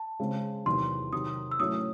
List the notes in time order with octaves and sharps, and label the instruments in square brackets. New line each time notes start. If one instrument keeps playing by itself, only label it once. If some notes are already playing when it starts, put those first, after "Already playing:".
Already playing: [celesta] A5
[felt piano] C#3 G#3 C4
[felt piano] E2 C3 D#3 F#3 [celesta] C6
[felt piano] C3 D#3 F#3 [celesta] D#6
[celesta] E6
[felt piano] A2 F#3 A3 C#4 [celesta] D#6